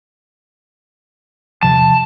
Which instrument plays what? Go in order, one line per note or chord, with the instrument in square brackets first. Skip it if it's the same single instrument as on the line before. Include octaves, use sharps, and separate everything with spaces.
[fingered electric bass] E2 C3 F3 [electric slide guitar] A5